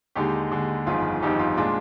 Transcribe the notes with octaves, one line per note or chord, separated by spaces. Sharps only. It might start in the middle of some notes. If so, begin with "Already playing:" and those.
D#2 D3 G#3 D#4 G4
D#2 D3 G#3
G1 F2 D#3 F4 G#4
G1 F2 D#3 D#4 G4
F4
A#2 G#3 D4 F4